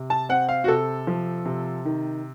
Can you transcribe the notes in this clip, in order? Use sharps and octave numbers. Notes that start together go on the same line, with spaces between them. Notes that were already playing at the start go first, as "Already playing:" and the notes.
Already playing: C3
A5
C4 F#5
F5
F#4
C3 A4
F3
C3
D#3